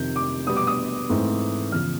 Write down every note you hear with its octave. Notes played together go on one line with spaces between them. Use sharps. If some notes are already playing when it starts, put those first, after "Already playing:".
Already playing: F2 C3 D#3 G6
D6
B2 G3 B3 D#6
D6
D#6
G#2 E3 A3 C4
E2 C#3 F3 F6